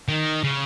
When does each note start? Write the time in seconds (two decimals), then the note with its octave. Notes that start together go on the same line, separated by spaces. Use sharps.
0.09 D#3
0.44 C#3